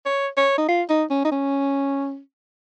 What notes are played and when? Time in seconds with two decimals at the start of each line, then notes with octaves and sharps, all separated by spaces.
0.06 C#5
0.37 C#5
0.58 D#4
0.68 F4
0.89 D#4
1.10 C#4
1.25 D#4
1.31 C#4